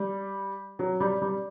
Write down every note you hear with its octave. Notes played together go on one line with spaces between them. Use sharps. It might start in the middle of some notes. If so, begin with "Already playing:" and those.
Already playing: G3
F#3
G3
G3